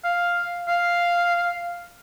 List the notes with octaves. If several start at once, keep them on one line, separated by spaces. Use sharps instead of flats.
F5
F5